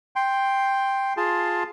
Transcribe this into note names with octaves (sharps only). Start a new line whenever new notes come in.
G5 C6
F4 G#4 A5 C6